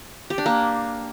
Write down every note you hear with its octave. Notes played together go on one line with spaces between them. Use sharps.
G4
D4
A#3